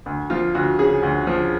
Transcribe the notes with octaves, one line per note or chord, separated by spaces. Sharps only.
D2
F3 F4
D2 F#4
C#3 G#4
D2
F3